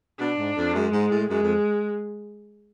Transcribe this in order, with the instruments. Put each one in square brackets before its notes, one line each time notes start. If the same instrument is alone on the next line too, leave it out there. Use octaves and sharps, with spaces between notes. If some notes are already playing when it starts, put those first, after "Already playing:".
[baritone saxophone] B2 [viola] D4
[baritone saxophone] G#2
F2
[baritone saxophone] F#2 [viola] G#3
[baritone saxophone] G#2
A2
[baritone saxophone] F#2 [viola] G#3
[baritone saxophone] F2